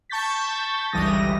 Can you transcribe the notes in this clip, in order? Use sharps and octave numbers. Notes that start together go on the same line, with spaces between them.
A5 C#6 G6 A6 B6
G1 C#2 E3 G3 D#6 A#6